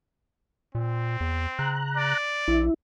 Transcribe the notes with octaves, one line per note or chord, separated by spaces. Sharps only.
A#2 C4
E2
C#3 A#5 F#6
D5
A#1 E4